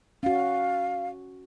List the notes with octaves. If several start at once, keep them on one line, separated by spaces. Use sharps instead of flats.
C#4 F#4 F5